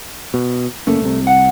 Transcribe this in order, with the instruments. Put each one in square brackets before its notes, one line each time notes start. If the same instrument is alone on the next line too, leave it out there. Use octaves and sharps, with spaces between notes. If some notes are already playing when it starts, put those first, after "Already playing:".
[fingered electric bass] B2
[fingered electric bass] F#1 A#3 C#4 [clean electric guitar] A3
[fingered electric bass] C2 C3
[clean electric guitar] F#5